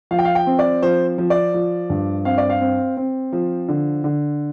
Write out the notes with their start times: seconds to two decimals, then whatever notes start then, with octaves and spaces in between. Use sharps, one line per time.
0.11 F3 F5
0.19 G5
0.25 F5
0.35 G5
0.47 C4
0.59 D5
0.83 F3 C5
1.18 F3
1.30 D5
1.54 F3
1.90 G2
2.25 C4 F5
2.38 D5
2.50 F5
2.61 C4
2.97 C4
3.33 F3
3.69 D3
4.04 D3